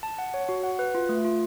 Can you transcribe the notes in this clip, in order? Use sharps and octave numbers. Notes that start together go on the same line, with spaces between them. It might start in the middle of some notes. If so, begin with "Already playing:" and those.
A5
F#5
C#5
F#4
F#5
B4
F4
A3
F4